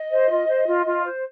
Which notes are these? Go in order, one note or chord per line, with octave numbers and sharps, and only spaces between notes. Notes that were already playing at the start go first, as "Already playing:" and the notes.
Already playing: D#5
C5
F4
C5
F4
F4
C5